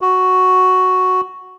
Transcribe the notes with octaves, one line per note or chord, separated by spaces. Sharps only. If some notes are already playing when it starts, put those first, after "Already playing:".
F#4